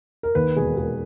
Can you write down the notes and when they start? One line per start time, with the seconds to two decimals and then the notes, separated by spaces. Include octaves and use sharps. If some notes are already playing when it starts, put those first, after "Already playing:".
0.23 A#4
0.35 D#2 B4
0.56 E1 G#4
0.77 E1 G#4